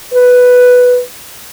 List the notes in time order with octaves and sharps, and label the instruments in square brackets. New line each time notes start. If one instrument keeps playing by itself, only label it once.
[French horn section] B4